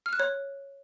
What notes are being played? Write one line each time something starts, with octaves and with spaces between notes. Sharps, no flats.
F6
F#6
C#5